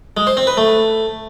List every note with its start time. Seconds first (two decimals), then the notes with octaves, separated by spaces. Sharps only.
0.17 G#3
0.27 C5
0.37 C4
0.47 B4
0.57 A3